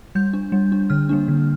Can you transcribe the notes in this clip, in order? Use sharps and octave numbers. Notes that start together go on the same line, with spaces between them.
G3 G6
D4
G3
D4
D3 F6
G3 A#3 D4
D3